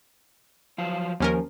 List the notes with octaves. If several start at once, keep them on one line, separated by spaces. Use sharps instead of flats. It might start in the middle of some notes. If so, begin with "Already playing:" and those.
F3 F#3 F5
D#2 F3 C#4 A#4